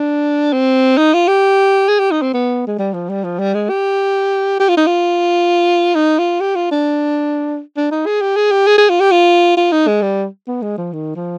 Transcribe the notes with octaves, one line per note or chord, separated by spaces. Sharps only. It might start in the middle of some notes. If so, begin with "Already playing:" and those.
Already playing: D4
C4
D#4
F4
G4
G#4
G4
D#4
C4
B3
G#3
G3
F3
G3
F3
G3
G#3
G4
G4
F4
D#4
F4
D#4
F4
G4
F4
D4
D4
D#4
G#4
G4
G#4
G4
G#4
G#4
F4
G4
F4
F4
D#4
G#3
G3
B3
G#3
F3
D#3
F3